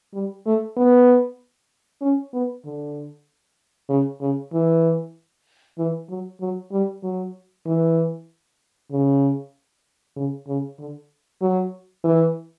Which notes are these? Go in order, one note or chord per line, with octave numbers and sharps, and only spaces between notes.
G3
A3
B3
C#4
B3
D3
C#3
C#3
E3
E3
F#3
F#3
G3
F#3
E3
C#3
C#3
C#3
D3
F#3
E3